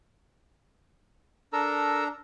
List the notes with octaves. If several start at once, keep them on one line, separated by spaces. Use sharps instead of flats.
D4 A4 A#4 A#5 E6